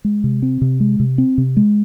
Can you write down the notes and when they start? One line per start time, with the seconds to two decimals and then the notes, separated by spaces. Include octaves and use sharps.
0.05 G#3
0.24 C3
0.42 C4
0.61 C3
0.80 G#3
1.00 C3
1.18 C4
1.38 C3
1.57 G#3